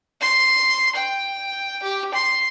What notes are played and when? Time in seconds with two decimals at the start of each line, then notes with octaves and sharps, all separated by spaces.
0.21 C6
0.95 G5
1.83 G4
2.14 C6